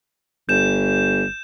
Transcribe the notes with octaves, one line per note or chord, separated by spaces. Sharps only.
G1 G6 E7